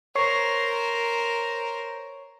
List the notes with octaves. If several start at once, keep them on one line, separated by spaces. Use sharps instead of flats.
A#4 C5 C#5 C#6 C7